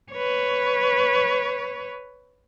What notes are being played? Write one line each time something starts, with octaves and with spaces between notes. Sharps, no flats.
B4 C#5